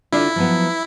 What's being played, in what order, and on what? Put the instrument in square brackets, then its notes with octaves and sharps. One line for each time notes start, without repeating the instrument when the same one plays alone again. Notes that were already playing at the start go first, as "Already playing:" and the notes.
[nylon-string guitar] D3 D4 F4 [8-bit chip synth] E4
[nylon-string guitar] F3 F#3 B3